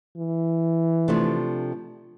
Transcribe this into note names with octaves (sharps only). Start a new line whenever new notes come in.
E3
C3 F3 A3 D4